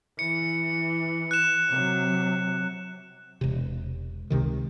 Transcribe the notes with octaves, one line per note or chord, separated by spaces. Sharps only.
E3 C#7
F#6 E7
C3 F#3
E1 C3
C#2 C3 D#3